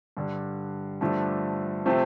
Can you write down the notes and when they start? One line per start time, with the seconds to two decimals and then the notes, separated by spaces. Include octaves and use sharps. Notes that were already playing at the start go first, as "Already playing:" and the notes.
0.17 G2 D3 G3 D4
1.01 G2 D3 F3 A3 D4
1.86 C3 F3 A3 C4